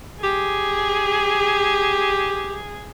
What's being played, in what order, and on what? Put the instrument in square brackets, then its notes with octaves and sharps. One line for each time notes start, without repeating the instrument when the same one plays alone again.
[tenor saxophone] G4 [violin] G#4